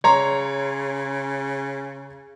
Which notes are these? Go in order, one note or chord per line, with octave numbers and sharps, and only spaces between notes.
C#3 C#5 A#5 C6